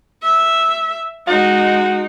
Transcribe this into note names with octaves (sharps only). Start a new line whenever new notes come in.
E5
G#3 D#4 F#4